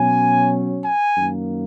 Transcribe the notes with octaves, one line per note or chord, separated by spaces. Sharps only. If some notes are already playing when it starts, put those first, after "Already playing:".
Already playing: B2 F#3 C#4 G#5
G#5
F#2 D#3 A#3